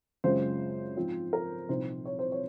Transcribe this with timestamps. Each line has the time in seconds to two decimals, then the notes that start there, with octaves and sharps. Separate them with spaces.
0.24 F#2 C#3 G#3 C4 F4 C5
0.97 G#2 F3 C4 F4
1.33 A#4
1.69 C2 A#2 F3 C4 D#4 C5
2.05 C#5
2.19 C5
2.32 C#5